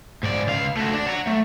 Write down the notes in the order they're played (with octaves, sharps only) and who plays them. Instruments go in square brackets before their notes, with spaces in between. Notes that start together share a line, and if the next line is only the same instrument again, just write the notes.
[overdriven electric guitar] G#2 D5
C#2 F5
A3 F#4
D4
F#5 A#5
A3